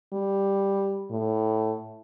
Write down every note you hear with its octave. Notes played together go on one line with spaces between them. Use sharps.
G3
A2